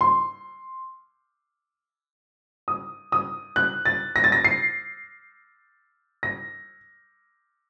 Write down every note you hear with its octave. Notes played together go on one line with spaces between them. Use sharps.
C6
D#6
D#6
F#6
A6
A#6
A6
A#6
C7
A#6